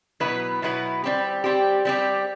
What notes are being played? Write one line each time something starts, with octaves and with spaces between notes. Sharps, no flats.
B2 F#3 B3 E4 B4
B2 F#3 B3 E4 B4
G3 C4 G4
G3 C4 G4
G3 C4 G4